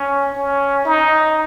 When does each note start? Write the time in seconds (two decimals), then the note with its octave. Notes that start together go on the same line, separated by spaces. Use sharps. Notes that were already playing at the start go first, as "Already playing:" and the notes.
Already playing: C#4
0.35 C#4
0.85 D#4